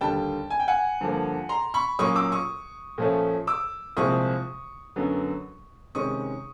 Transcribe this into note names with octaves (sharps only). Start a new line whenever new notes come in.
D#2 D3 G3 G5 A5
G#5
G5
F#5 G#5
G2 D3 F3 A#3
A#5 C6
B5 C#6
A#2 F#3 A#3 C#4 C#6 D#6
D6 E6
C#6 D#6
A#2 F3 A3 C#4
D6 E6
C2 A#2 F3 G#3 C4 C#6 D#6
F#2 D3 F#3 B3
C3 D#3 G#3 C#4 C#6 D#6